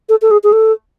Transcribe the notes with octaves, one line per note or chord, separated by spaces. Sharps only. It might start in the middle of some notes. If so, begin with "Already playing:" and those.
A4
A4
G#4
G#4
A4